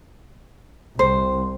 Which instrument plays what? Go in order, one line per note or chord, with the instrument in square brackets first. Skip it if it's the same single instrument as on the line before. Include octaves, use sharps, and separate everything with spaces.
[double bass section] C2 [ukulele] C5